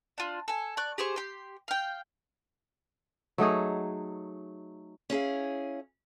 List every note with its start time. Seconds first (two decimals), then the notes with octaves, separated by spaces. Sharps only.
0.18 D4 F4
0.48 A4 G#5
0.77 D5 C#6 F#6
0.98 G4 G#4 C5 C#6
1.16 G4 C6
1.68 F5 G5
3.38 F#3 A3 D#4 G#4
5.10 C#4 E4 G#4 F5